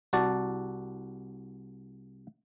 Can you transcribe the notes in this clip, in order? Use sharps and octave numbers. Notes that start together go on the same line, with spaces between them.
C2 F#4 D5 A5